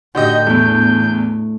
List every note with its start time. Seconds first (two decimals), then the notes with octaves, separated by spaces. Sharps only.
0.15 A2 D3 F#4 G4 D#5 G6
0.47 E2 A3 E4